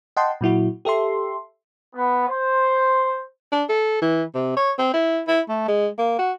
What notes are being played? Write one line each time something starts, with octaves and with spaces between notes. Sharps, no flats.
D#5 F#5 G5 A5 C6
A#2 F#3 E4 F#4
G4 A4 E5 C6
B3
C5
D4
A4
E3
C3
C#5
C4
E4
E4
A3
G#3
A#3
F#4